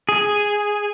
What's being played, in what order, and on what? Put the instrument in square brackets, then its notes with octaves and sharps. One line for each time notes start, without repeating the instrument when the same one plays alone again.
[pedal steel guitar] G#4